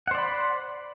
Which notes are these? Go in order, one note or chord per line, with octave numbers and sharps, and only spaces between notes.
C5 D5 F#5 B5